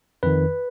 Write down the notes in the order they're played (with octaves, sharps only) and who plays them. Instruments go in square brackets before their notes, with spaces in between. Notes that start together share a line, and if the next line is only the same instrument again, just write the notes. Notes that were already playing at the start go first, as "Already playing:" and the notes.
[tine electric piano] F2 D#3 B4